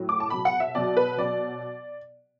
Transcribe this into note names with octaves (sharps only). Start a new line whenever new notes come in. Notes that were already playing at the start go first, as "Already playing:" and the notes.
Already playing: A2 F#3
D6
A5
B2 F#3 B5
F#5
E5
B2 F#3 D5
B4
B2 F#3 D5